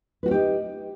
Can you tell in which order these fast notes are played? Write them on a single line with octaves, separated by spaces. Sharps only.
B4 F#4 C#4 G4 D#4